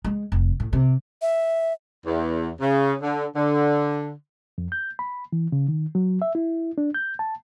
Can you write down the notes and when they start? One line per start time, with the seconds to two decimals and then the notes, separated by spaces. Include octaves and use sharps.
0.04 G#3
0.32 F1
0.60 A2
0.73 C3
1.22 E5
2.06 E2
2.61 C#3
3.02 D3
3.36 D3
4.58 F2
4.72 G6
4.99 B5
5.33 E3
5.52 C#3
5.68 D#3
5.95 F#3
6.22 E5
6.35 E4
6.78 D4
6.95 G6
7.19 A5